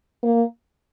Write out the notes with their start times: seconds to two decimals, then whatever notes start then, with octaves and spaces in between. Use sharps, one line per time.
0.23 A#3